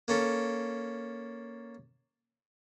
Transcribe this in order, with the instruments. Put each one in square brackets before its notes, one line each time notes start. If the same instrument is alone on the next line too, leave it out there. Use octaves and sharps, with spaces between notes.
[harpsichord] A#3 C#4 A4